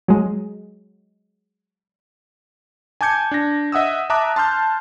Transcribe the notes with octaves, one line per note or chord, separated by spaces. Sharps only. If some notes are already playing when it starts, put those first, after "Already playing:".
F#3 G#3
G#5 A5 D6 G6 G#6 C#7
D4 A#6
D#5 E5 F#5 D#6 E6
E5 A5 A#5 D6 D#6 F#6
A5 C6 F6 G6